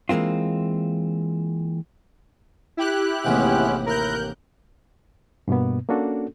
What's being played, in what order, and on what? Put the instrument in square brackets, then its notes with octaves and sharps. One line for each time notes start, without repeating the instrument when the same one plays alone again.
[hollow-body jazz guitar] E3 G#3 A#3 C4 F4
[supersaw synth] E4 G4 F#6
[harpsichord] A1 D#2 C3 [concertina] G#3 B3 C#4
[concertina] E4 A#5 [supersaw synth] A#4 F#6 G6
[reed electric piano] G2 B2 A#3 B3
A#3 C#4 D4 F#4 A4